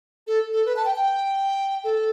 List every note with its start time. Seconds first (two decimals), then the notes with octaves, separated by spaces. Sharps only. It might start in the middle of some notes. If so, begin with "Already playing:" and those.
0.27 A4
0.53 A4
0.66 B4
0.76 A5
0.85 G5
0.96 G5
1.84 A4